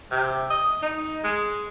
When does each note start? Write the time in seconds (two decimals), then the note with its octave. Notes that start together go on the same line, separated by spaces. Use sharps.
0.11 C3
0.50 D#5
0.82 D#4
1.24 G#3